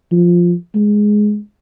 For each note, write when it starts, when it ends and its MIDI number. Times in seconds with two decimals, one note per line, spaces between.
0.11 0.53 53
0.75 1.38 56